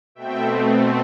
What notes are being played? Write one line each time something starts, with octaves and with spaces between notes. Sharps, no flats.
B2 A3 C4 E5 G5